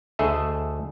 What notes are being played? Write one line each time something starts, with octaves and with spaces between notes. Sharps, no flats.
D2 A3 G#4 A4 D#5 E5